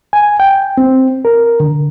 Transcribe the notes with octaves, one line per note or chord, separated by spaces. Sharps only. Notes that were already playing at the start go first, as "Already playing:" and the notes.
G#5
G5
C4
A#4
D3